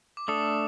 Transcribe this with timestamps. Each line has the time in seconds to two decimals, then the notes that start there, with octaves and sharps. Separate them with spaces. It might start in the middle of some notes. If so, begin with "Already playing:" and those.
0.17 D6
0.28 A3 D4 A4 D#6